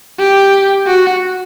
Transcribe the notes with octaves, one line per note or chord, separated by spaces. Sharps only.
G4
F#4